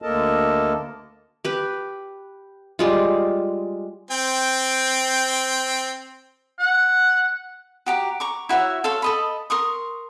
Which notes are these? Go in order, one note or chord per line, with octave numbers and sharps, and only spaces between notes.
D2 A#3 A4 A#4 D#5 A5
G4 B4
G3 G#3 F4
C4 G5
F#5
F#4 G4 A#5 D6
A#5 C#6 D6
E4 F#4 C#5 E5
A4 C#5 F5 C6
A4 D#5 B5
A#4 C6 C#6 D#6